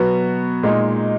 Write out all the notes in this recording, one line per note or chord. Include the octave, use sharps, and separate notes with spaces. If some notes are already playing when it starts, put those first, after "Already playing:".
Already playing: B2 F#3 B3 F#4
A#2 G#3 D#4